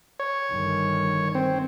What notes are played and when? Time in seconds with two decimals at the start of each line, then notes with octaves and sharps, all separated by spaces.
0.20 C#5
0.51 G1 D#3
1.35 C4